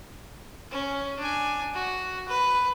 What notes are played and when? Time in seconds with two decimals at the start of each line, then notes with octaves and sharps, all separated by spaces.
0.71 C#4
1.19 D4 G#5
1.74 F#4
2.28 B4